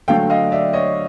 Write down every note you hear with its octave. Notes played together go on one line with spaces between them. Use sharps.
D3 F#3 A3 F5 G5
D#5 F5
D5 E5
C#5 D#5